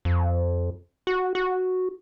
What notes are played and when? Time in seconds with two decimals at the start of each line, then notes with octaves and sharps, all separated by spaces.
0.05 F2
1.07 F#4
1.35 F#4